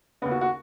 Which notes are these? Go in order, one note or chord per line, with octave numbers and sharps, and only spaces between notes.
D#2 C#3 B3
F#4
F#4